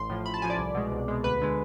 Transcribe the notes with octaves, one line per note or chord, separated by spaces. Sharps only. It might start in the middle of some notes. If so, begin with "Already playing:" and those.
Already playing: A1 C6
A2 F3
A1 B5
A5
A2 F3 G#5
D5
C2
B2 G#3
C2
B2 G#3
D2 B4
D3 G#3